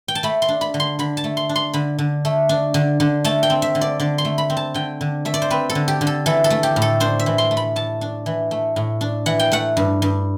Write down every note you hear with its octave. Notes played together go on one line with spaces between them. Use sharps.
G5
A5
A3 B5
C6
D4
B5
D3
C6
D3 B5
A5
A3
C6
D4
C6
D3 B5
D3
A3
D4
D3
D3
A3 A5
G5
C4
E5
D3
D5
D3 D5
C6
A3
B5
C4
A5
D3 G5
D3
A3 E5
D5
C5
C4 B4
A4
D3
G4
D3
A4
E3 A4
A4
A3
G4
A2
A4
D4 C5
E5
E3
C6
A3
B5
A2 A5
D4
E3
A3
A2
D4
E3 F#5
G5
A3 F#5
G2
G2